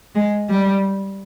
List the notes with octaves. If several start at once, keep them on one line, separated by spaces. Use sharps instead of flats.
G#3
G3